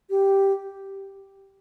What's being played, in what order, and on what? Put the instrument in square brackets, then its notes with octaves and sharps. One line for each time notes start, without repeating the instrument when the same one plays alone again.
[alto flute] G4